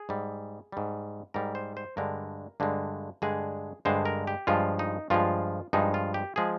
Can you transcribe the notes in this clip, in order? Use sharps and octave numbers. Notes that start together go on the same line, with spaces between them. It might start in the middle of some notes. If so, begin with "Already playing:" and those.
Already playing: G#4
G#2 G3
G#2 G3
G#2 G3 A#4
C5
C5
G2 D3 G#3 A#4
G2 D3 G#3
G2 D3 G#3 G#4
G2 D3 G#3 C5
A#4
G4
G2 F3 G#3 F4
D#4
G2 F3 G#3 F4
G2 F3 G#3 D#4
F4
G4
F3 G#3 G#4